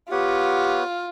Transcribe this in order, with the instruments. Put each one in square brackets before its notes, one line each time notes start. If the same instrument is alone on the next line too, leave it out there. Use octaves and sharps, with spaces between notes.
[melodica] B3 C#5 F#5 [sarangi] F4 [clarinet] G4